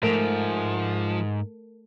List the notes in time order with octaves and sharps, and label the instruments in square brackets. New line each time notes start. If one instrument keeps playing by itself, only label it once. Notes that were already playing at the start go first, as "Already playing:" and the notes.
[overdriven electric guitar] G#2 [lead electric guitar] F3 [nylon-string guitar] A3 [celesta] A#4 D7 F7